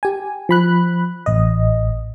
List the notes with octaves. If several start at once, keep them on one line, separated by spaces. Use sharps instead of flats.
G4 G#5
F3 B5 F#6
A1 D#5